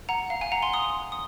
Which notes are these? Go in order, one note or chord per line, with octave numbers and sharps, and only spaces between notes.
F#5 A#5
F5
F5 G#5
F#5 A#5
G#5 C6
C6 D#6
D#6